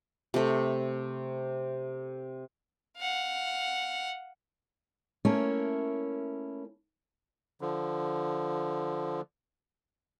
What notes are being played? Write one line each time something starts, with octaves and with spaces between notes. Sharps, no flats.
C3 A3
F5 F#5
A3 A#3 C#4 E4 A#4 C#5
D3 F3